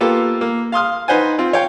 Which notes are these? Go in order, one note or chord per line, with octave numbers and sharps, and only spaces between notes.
A#3 B3 F4 G4 A4
A#3
F5 C6 D#6 F6
D#4 B4 C5 F#5 G#5
C4 F4
C#5 F5 G5